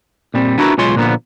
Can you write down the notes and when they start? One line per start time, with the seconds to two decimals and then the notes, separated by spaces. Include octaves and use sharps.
0.34 A#2 G3 C4
0.58 B3 D4 E4 F#4 G4 A#4
0.78 B1 G#3 F4 C#5 C6
0.96 A#2 D3 F3 A#3 B3